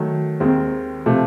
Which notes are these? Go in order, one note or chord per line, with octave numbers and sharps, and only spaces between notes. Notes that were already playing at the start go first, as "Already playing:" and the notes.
Already playing: D#3 F#3 A3
D#2 D#3 G#3 C4
C3 F3 A3